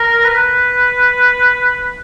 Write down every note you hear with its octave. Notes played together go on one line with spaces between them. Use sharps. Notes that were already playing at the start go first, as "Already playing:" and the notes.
Already playing: A#4
B4